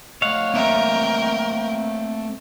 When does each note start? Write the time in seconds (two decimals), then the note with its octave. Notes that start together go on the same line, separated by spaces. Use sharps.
0.22 A3 C#5 D#5 F5 F#5
0.54 A#3 C4 A#4 E5 G5